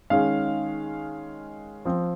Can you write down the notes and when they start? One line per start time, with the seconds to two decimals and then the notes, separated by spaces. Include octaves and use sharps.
0.10 D#3 G#3 C#4 F5
1.85 F3 C4